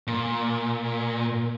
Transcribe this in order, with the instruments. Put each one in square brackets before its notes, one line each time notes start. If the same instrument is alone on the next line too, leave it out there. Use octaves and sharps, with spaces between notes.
[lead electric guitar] A#2